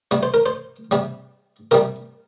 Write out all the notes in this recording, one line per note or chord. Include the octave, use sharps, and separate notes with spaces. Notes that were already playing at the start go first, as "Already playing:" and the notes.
C3 G3
C5
A#4
C5
C3 G3
C3 G3 A#4